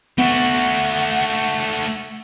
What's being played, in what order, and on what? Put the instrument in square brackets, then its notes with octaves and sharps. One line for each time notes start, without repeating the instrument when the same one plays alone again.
[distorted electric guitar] A3 F#4 [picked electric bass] B3 [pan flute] F#5